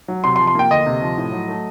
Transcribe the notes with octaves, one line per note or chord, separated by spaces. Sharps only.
F#3
C3 C6
C6
F3
C6
A#3 G5
D2 D#5
C3
F3
A2
F#3
A3